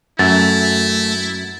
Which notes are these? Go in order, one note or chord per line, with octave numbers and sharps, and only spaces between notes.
F#2 A3 E4 A6